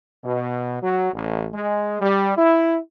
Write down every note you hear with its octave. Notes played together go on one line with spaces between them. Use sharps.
B2
F#3
A1
G#3
G3
E4